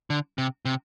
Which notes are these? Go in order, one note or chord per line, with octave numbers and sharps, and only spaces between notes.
D3
C3
C3